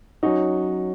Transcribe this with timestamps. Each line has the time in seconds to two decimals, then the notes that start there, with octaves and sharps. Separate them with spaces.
0.23 F#3 C#4 D#4 F#4